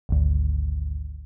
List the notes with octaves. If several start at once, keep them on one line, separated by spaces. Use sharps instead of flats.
G#1 D2